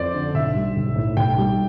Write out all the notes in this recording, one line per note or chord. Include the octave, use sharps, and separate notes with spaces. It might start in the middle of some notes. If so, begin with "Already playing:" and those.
Already playing: F2 C5 D5
D3
B1 E5
G3
B1
A2
B1 G5
G3